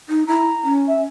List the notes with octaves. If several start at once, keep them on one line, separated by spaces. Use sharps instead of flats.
D#4
E4 A#5
C#4
E5